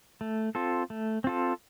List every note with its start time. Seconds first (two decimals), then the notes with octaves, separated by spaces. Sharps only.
0.21 A3
0.55 C4 F4 A4
0.90 A3
1.24 C4 F4 A4